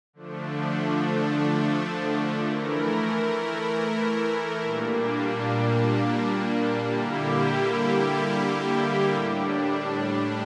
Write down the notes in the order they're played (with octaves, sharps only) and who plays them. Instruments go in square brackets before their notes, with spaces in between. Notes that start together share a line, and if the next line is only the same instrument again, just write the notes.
[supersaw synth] D3 F3 A3 D4
E3 A3 E4 A#4
A#2 G3 A#3 D4
D3 G3 A#3 E4 G4
A2 G3 D4